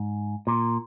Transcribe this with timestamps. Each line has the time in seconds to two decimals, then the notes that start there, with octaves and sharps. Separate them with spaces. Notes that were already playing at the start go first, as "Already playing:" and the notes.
Already playing: G#2
0.47 A#2